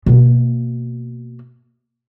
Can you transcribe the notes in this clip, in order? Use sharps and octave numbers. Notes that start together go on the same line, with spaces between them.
B2 A#3